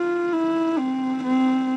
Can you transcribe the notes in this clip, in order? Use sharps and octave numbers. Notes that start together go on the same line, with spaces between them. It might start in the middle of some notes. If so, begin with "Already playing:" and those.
Already playing: F4
E4
C4
C4